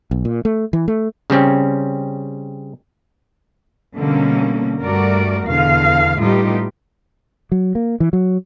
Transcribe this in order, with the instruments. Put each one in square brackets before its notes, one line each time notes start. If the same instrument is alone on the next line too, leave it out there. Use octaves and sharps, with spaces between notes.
[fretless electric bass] B1
A#2
A3
E3
A3
[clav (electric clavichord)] C#3 G3 C4 C#4
[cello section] B2 D3 G3 A#3 C#4
G2 G3 A3 F#4 A#4 D5
E2 B2 D3 F5
A2 G3 B3 D#4 F4 G4
[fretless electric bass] F#3
A#3
E3
F#3